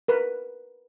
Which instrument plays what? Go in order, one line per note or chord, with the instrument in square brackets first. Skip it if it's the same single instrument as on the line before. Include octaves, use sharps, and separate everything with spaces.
[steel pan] A#4 B4